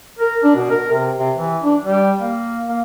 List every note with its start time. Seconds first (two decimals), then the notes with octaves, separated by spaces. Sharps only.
0.19 A#4
0.43 D4
0.55 B2
0.70 A#4
0.91 C3
1.18 C3
1.37 E3
1.63 D4
1.84 G3
2.21 A#3
2.68 A#3